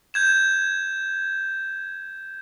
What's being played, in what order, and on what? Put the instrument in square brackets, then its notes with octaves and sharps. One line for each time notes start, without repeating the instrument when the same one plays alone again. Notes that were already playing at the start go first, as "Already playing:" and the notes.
[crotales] G6 G#6 E7